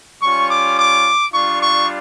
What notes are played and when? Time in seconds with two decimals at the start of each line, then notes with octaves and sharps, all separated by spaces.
0.22 G3 C#4 F4 C#6
0.49 D6
0.77 D6
1.34 G3 D4 F4 C#6
1.63 C#6